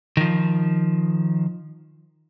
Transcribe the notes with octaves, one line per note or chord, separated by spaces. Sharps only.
D#3 F3